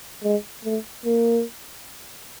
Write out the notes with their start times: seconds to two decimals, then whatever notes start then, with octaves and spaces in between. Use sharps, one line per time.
0.23 G#3
0.65 A3
1.06 A#3